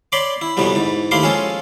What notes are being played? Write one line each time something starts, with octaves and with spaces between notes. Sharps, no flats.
C#5 D5 B5 C6 D6
E4
F2 C3 E3 F#3 G3 B3
G#2 E3
D#2 A3 E4 F5 C6 D6
F3 G#3 C#4 F4 G#4 A4